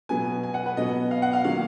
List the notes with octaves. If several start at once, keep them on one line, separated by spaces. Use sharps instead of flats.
B2 F#3 B3 G#5
G#5
F#5
B4
B2 F#3 B3 D#5
F5
F#5
F5
D#3 F#3 A#3 F5